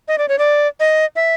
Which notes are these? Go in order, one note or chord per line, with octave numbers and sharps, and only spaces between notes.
D#5
D5
C#5
D5
D#5
E5